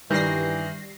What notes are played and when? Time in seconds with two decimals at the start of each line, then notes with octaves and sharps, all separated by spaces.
0.11 G2 D#3 E3 G3 A#6 C7